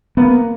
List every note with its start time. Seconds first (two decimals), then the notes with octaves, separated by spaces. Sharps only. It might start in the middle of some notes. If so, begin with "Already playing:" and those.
0.17 A#3 B3